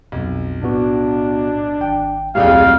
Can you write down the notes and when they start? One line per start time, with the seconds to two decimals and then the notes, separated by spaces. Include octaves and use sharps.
0.12 B1 F2
0.63 A2 B3 D4 F#4
1.81 G#1 G5
2.35 D1 A#1 F2 G#3 G4 G#4 F5